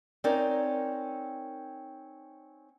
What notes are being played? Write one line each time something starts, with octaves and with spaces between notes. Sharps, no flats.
C4 C#4 D#4 A#4 D5